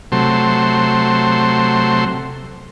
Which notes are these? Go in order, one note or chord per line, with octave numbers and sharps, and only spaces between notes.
C3 F#3 A3 C6